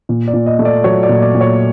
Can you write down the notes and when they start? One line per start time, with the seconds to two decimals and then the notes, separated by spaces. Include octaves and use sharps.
0.09 A#2
0.28 D5
0.34 A#2
0.46 D#5
0.59 A3
0.65 D5
0.84 F#3 C#5
1.03 D5
1.09 A#2
1.22 D5
1.35 A#2
1.41 C#5